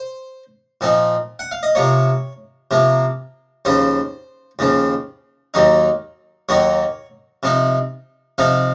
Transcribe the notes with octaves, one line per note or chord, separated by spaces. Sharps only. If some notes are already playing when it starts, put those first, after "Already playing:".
Already playing: C5
A#2 F3 C4 D#4
F#5
F5
D#5
C3 F3 A#3 C#5
C3 F3 A#3
D#2 C#3 F3 C5
D#2 C#3 F3
D#2 D#3 F#3 A#3 D#4
D#2 D#3 F#3 A#3 D#4 C#5
C3 F3 C4 D#4
C3 F3 C4 D#4 F5